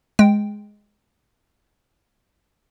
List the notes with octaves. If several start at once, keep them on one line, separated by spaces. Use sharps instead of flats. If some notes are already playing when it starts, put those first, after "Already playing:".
G#3 G5